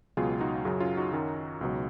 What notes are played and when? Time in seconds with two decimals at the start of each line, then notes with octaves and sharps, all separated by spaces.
0.17 C#2 B2 F#3 F4 G#4
0.41 D#4 F#4
0.65 F#2 C#3 F#3
0.80 C#4 F4
0.97 D#4 F#4
1.13 F#2 D#3 F#3
1.61 C#2 B2 F#3